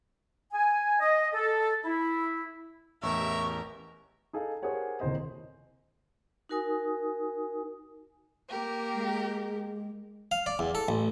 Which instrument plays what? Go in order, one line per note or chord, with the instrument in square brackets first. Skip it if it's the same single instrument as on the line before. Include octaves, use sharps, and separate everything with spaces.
[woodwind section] G#5
D#5
A4
E4
[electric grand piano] A1 E2 [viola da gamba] G4 A#4 [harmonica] E5 [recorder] C#6
[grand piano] D#4 G#4 A4 F5
G4 G#4 A#4 C5 C#5 F#5
D#1 C2 C5 D#5
[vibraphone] D#4 F#4 A#4 G#5 D#6
[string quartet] A#3 G4 A#4
[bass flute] G#3
[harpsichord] F5
D5
E2
A4
A1